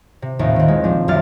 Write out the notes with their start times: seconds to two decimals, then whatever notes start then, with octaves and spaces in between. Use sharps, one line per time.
0.22 C3
0.39 A#1 D#2 A2 D#3
0.56 D#3 C4
0.68 G#3
0.84 F3 D4
1.08 D#1 C2 F#2 D4 F6 A6